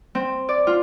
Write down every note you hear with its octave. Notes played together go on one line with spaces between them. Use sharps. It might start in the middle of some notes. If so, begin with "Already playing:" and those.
C4
D5
F4